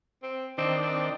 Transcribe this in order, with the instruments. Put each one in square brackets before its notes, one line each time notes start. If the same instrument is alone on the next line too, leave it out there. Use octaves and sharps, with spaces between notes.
[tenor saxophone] C4
[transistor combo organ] D#3 D4 [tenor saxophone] C4
[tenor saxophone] C4